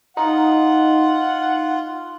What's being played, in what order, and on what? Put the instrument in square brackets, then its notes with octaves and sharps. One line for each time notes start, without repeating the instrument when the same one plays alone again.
[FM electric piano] D#4 [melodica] F4 [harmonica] F#5